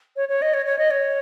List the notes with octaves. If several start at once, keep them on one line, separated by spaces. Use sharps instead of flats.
C#5
C#5
D#5
C#5
C#5
D#5
C#5